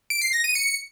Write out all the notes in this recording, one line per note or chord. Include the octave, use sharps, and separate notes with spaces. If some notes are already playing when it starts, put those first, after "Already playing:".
D7
C7
A#6
D#7
C#7